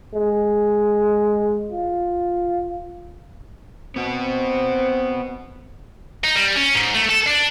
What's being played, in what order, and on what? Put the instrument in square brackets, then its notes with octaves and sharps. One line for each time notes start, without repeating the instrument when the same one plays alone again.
[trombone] G#3
F4
[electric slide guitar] B3 F#4 [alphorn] C4
[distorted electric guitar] D#4
G3
C#4
G#2
A3
A4
D4